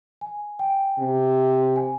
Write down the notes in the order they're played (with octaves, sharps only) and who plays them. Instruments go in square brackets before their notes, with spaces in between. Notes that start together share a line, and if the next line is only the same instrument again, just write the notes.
[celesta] G#5
G5
[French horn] C3
[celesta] G#5